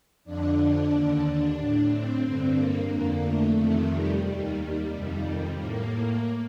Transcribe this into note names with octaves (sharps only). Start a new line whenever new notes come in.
F2 D3 D4
D#2 D3
D4
A2
C4
G2 D3
A#3
F2 D3
A3
F2 C3 D#3
G3
D#2 D#3 G3
G3
F2 C3 D#3
A2 A#3